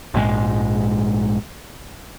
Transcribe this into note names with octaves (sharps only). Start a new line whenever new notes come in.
A#1 G#2 D#3 G#3